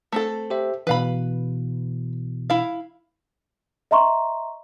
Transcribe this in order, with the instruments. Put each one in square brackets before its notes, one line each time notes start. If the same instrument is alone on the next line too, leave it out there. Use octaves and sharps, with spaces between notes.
[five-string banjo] A3 C4 A4
[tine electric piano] G4 C5 E5
[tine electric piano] B2 E3 [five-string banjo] B4 F5 B5
[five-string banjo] E4 F5
[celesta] D#5 E5 A#5 C6 C#6